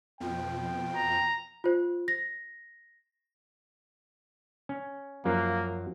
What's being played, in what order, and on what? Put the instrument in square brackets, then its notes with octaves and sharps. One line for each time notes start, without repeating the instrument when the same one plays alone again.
[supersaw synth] F2 B2 F3 [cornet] G5
[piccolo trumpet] A#5
[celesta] F4 C5
A#6
[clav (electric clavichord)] C#4
[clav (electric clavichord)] F#2 F3 F#3 [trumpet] A#3